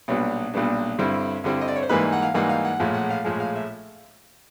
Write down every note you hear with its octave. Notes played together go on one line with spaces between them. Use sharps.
B1 A#2 G3 B3 D4 C#5
B1 A#2 G3 B3 D4
G2 D3 G3 C4 E4
G2 D3 G3 C4 E4
D#5
D5
C#5
C5
G#2 E3 G3 A#3 D#4 B4
F#5
F5
G#2 E3 G3 A#3 D#4 F#5
F5
F#5
A#1 A2 F3 G#3
F#5
F5
A#1 A2 F3 G#3
F5
E5